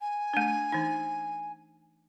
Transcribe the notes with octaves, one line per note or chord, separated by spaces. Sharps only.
G#5
A3 D4
E3 D#4